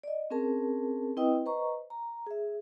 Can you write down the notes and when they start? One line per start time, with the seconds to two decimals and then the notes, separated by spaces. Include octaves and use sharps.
0.04 D5 D#5
0.30 C4 C#4 G#4 A#4 A5
1.17 C4 E4 B4 D#5 G5 D#6
1.46 B4 C5 D#5 A#5 C#6
1.90 A#5
2.27 G#4 E5